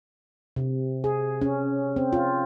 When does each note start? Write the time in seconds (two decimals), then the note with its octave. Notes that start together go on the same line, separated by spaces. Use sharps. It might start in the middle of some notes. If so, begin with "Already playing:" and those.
0.56 C3
1.04 G#4
1.41 C#4
1.96 C4
2.13 F4